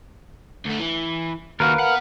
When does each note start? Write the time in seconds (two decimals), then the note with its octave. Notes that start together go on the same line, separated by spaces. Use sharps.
0.66 D2 A3
0.79 E3
1.60 D#2 F#4 A#4 B4 F5
1.79 B3 F#5